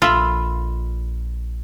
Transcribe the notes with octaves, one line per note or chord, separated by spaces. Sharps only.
A#1 F4 A4 E5 B5 C6